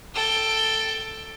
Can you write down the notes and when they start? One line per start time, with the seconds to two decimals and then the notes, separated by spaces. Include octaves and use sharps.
0.14 A4 G5